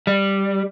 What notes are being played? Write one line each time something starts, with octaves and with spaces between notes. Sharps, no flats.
G3